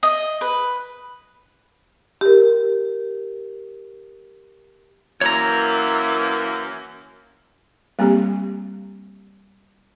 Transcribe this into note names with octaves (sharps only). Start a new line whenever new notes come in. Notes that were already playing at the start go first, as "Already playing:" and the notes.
D#5
B4
G4 A#4
F#2 E3 A#3 C#5 A#5
G3 A#3 C4 G4